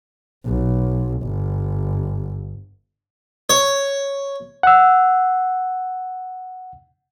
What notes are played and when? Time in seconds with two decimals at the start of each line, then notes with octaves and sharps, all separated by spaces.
0.45 B1
1.23 G1
3.50 C#5
4.63 F#5 E6